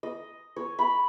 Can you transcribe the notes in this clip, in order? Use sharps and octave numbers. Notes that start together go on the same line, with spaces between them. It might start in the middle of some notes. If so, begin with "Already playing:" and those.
D#5
C#5
B5